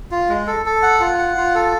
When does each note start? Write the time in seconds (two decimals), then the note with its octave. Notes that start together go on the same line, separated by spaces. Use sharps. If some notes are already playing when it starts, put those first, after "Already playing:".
0.11 F4
0.30 G#3
0.47 A4
0.66 A4
0.82 F#5
1.00 F4
1.19 F#5
1.37 F4
1.55 A4